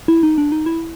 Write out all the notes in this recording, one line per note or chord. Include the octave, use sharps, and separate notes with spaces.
E4
D#4
D4
D#4
E4